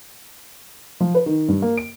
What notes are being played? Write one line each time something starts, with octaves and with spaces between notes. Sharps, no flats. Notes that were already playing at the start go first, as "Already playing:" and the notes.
F3
B4
D#3
G2
A#3
D7